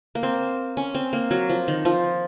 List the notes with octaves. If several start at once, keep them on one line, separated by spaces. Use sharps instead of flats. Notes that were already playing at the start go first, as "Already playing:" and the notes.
A#3
C4
C#4
C4
A#3
F#3
F3
D#3
F3